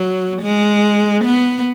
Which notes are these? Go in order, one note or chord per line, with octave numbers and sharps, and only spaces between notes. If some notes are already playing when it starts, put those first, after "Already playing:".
Already playing: F#3
G#3
B3